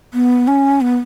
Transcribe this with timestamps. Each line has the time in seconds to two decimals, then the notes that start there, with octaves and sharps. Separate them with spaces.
0.14 B3
0.48 C#4
0.81 B3